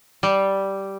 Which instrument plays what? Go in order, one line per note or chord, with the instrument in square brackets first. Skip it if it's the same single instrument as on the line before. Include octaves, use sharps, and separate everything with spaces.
[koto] G3